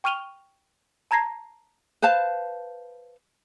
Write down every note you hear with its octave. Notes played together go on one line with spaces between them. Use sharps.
G5 C#6 F6 D#7 F7 G7
A5 A#5 G#6 A#6 C7
B4 C5 F5 A5